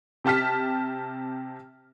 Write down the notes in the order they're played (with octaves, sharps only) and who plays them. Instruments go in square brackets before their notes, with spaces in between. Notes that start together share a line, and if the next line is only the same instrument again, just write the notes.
[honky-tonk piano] C3 G4 A5 F6 B6